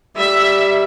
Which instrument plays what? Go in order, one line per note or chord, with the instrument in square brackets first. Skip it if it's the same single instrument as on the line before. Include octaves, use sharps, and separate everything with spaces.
[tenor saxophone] G3 [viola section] E5